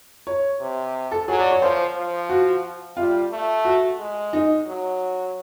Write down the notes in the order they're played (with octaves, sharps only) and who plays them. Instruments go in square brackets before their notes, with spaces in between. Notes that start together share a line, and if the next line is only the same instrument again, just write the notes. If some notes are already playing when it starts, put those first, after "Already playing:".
[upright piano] C#5
[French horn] C3
[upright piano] A4
[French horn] F#3 [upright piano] G#4
[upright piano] D5
C#5
[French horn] F3 [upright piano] C5
[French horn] F3
[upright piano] F#4
[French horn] G3 [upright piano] F4
[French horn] A3
[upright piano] F#4
[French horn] G#3
[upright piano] D#4
[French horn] F#3